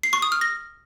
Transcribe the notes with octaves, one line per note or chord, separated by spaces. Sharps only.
C7
C#6
D#6
F6
A#6